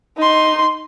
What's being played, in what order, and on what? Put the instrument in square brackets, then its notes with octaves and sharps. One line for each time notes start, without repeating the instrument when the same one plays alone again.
[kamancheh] D#4 C6